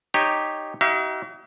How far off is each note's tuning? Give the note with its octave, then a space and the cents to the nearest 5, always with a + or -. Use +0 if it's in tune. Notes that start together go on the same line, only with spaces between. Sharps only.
D#4 -15 G4 +0 C#5 -5
D#4 +25 F#4 +45 E5 +45